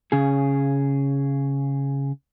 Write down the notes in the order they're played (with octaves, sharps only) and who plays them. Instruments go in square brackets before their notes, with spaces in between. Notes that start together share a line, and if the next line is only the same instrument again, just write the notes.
[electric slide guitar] C#3 G#4